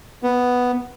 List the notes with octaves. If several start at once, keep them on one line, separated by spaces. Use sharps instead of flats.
B3